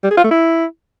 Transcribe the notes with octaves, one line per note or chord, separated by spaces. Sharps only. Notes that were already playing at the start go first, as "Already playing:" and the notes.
G3
G#4
F4
A3
E4